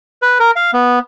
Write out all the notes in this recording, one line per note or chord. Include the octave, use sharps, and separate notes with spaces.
B4
A#4
F5
B3